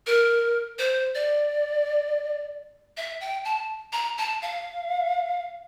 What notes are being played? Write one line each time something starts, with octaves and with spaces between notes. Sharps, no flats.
A#4
C5
D5
E5
G5
A5
A#5
A5
F5